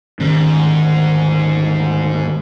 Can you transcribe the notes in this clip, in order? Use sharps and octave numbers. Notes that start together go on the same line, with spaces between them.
D2 G#2 D#3 C#4